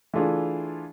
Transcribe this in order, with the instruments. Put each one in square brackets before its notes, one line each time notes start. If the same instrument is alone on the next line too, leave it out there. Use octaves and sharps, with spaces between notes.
[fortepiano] E3 A3 D4 F4 G#4